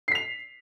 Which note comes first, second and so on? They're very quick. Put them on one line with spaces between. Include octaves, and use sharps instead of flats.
C7 B6 F7